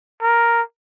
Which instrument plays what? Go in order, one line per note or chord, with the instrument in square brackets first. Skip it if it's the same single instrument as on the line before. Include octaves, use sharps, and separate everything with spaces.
[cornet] A#4